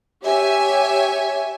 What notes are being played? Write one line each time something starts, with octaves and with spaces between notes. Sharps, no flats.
G4 C#5 E5 G#5